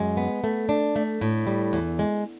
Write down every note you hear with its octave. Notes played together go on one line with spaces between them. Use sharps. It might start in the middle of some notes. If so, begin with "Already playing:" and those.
Already playing: F#2 G#3
B3
A3
D4
A3
A2
G3
E2
G#3